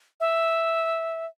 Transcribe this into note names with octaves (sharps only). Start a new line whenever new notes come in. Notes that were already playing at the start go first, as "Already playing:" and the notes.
E5